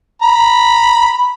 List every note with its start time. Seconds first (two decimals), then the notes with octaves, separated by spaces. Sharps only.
0.22 A#5 B5